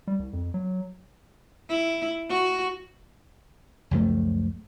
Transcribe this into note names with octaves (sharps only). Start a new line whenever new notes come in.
G3
C2
F2
F#3
E4
F#4
C#2 F#2 F3 A3